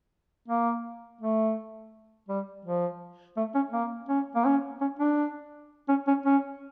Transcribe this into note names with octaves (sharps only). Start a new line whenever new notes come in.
A#3
A3
G3
F3
A3
C#4
A#3
C#4
A#3
C#4
C#4
D4
C#4
C#4
C#4